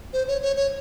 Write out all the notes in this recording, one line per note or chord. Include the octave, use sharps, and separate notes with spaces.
C5
C#5
C#5
C#5